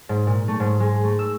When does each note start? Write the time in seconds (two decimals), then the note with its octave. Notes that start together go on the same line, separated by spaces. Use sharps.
0.09 G#2
0.27 A#2
0.48 A3
0.60 G#2
0.80 G#3
1.04 A3
1.19 E6